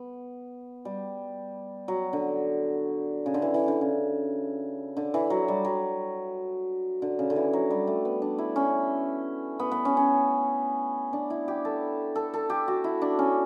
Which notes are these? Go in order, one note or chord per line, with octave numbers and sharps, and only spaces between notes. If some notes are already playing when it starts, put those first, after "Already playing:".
Already playing: B3
G3
F#3
D3
C#3
D3
E3
E3
D3
C#3
D3
E3
F#3
G3
F#3
D3
C#3
D3
E3
F#3
G3
A3
B3
D4
E4
C#4
B3
B3
C#4
C#4
D4
E4
G4
A4
A4
A4
G4
F#4
E4
D4
C#4